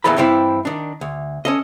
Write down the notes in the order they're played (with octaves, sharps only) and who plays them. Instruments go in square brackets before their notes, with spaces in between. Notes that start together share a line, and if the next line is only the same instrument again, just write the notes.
[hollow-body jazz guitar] E2 A#2 D#3 E3 A4 B5
G2 E3 G3 C4 E4
D#3 D4
D2
C#4 A4 D#5